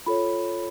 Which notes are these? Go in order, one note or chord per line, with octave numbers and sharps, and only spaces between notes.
F4 A4 C#5 B5